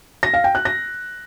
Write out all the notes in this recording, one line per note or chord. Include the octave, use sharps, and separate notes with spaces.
A#6
F5
G5
F#6
A#6